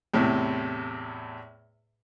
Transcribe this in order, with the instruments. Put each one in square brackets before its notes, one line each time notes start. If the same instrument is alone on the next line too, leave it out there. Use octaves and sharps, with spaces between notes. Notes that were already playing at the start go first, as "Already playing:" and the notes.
[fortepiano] E2 A2 C3